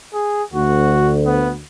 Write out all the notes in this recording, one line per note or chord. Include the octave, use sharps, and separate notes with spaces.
G#4
D2 F#4
B3